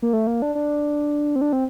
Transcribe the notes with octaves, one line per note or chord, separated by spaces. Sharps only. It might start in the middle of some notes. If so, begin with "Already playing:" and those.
A#3
A3
A#3
D4
D4
C4
D4
C4